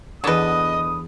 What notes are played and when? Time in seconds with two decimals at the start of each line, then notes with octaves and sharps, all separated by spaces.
0.24 E2 D3 B4 D#5 A5 D#6